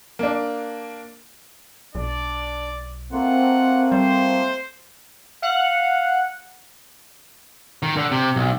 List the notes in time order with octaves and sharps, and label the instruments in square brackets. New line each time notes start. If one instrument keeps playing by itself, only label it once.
[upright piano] A#3 D4
[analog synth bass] B1 [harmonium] D4 [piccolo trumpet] D5
[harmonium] A3 A#3 F4 [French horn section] C4 [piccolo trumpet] F#5
[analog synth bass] G3 [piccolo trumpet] C5
[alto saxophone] F5 [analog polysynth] F#5
[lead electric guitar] D#3
D3
C3
B1